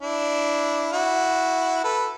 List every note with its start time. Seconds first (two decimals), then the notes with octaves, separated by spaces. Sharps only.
0.01 D4 E4
0.92 E4 F#4
1.84 A4 B4